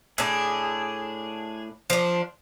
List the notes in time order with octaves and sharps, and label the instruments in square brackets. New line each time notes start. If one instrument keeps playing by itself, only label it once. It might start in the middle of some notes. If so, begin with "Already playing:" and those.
[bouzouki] A2 D4 [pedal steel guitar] G#4
[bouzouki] F3 D4